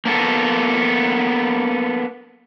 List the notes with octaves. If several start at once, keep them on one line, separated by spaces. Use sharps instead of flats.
A#3 B3 A4